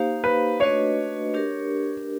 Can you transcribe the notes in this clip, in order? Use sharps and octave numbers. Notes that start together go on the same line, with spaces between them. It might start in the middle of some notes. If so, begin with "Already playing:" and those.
Already playing: A#3 D#4 G4 C5 F5
B4
A3 D4 F#4 B4 C#5 D#5
D4 G4 A#4